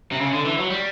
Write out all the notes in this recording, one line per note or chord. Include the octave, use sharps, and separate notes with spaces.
C3
C#3
D3
E3
F#3
G3